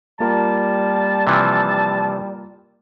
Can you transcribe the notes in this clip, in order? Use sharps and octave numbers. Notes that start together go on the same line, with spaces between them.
G3 A#3 F4 A#4 A5
C3 E3 F3